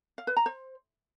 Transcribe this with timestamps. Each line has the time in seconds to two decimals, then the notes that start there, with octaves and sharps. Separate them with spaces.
0.18 F5
0.27 B4
0.37 A#5
0.46 C5